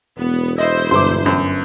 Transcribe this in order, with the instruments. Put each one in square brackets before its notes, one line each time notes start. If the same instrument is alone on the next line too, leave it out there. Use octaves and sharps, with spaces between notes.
[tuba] E1 [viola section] B3
[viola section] E4 C5 [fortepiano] D#5
[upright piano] G1 [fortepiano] C6 D6
[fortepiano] F#2